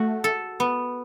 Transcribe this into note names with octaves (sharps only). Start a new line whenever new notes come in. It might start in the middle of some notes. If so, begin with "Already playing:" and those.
Already playing: A3 F#4
A4
B3